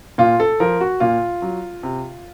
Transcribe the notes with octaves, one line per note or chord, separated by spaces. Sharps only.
A#2 F4
A4
F3 A#4
F#4
A#2 F4
F#3
C3